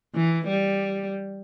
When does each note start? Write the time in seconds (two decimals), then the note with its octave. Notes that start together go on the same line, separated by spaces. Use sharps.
0.15 E3
0.47 G3